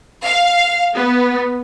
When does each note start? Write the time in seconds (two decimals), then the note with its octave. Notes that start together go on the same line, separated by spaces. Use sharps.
0.25 F5
0.94 B3